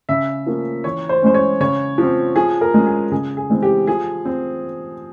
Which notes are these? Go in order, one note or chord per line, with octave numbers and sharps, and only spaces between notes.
C#3 E5
F3 A#3 C#4
E3 C#5
C5
G#3 C#4 C5
C#5
C#3 C#5
F3 C4
F3 G#4
A#4
G#3 C#4
G#4
C#3 G#4
G#4
E3 G#3 C4
G4
F3 G#4
C4